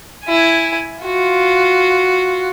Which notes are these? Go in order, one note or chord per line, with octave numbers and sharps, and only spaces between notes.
E4 G#5
F4 F#4